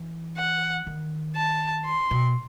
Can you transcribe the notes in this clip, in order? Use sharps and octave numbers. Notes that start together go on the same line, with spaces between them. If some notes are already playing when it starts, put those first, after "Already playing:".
Already playing: E3
F#5
D#3
A5
C6
B2